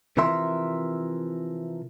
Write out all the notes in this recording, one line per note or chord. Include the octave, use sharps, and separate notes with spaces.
C3 E3 F3 A#4 E5 C6